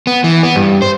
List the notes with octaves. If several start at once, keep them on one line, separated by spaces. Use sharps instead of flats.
B3
E3
B3
G2
C5